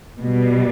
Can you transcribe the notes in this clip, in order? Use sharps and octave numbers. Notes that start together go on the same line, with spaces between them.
B2 G3